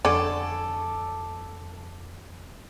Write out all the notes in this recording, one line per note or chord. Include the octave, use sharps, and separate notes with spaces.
F2 D3 C#4 A4 D6